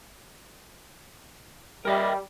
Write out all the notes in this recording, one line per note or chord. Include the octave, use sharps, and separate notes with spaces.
G3 A#4 D#5 E5